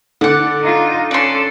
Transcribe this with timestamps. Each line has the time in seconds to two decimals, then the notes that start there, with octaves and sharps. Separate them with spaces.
0.21 D3 D5 F#5
0.62 D#4 F4
1.11 C#4 A4 D5 C6